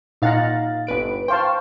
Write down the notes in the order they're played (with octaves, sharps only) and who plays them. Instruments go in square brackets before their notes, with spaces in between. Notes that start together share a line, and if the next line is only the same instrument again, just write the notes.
[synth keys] A#2 F5 A6 [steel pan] D#4 F#5 A#5
[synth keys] G1 B4 D7
[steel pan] C5 F5 A5 [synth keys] G5 C#6